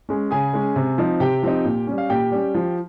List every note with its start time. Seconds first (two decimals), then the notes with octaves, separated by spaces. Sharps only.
0.09 G#3 C#4
0.31 C#3 G#4 G#5
0.54 G#3 C#4
0.76 C3
0.98 F3 C4 D#4
1.20 C3 G4 G5
1.43 F3 C4 D#4
1.65 A#2
1.87 G3 C#4
1.98 F5
2.10 A#2 G4 G5
2.32 G3 C#4
2.54 F3